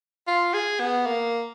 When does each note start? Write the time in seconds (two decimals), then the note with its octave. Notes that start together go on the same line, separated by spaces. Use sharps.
0.27 F4
0.53 G#4
0.79 B3
1.06 A#3